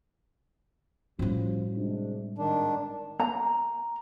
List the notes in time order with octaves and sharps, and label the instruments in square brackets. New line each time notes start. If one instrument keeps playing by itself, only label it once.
[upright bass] A2 G3 [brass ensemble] F3 C#4 F#4
[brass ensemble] C3 G#3 D4
[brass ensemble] G#1 [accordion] D#3 D4
[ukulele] A#5